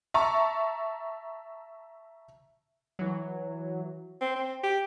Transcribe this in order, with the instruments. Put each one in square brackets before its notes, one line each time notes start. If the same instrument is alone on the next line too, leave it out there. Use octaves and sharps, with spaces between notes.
[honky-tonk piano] E5 A5 A#5 C#6
[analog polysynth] E3 F#3
[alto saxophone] C4
C4
G4